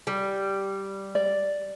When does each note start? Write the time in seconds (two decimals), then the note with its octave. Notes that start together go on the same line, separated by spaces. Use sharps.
0.07 G3
1.15 D5